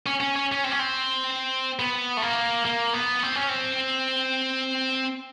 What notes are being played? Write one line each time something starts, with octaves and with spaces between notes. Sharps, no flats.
C#4
C#4
C#4
C#4
C4
C#4
C4
B3
A3
A#3
A#3
B3
C4
C#4
C4